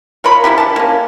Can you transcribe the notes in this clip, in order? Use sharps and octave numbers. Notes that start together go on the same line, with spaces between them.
F4 A#4 C#5 B5
F3 A#3 E4 G4
D3 A5
A#3 C#4